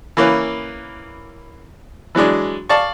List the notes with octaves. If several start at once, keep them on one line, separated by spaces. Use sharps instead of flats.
E3 A#3 C#4 B4
E3 F#3 G#3 D4
D5 F5 A5 C#6